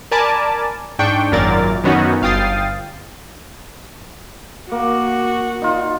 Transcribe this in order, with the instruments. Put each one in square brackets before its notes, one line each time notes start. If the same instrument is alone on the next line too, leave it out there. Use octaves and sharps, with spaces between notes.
[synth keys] A#4 D5 G#5 A5 B5 D6
G#2 D4 G5 C#6
G#1 F#2 A#2 A#4 D5 A6
F#2 D#3 B3 C#4 D#4 F#4
G1 F5 G5 D#6 A6 C7
[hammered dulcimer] A#3 [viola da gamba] F#4
[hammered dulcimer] D#4 F4